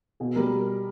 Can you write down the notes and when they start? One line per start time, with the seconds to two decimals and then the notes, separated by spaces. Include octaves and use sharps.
0.20 B2 G#4
0.36 G3 A#4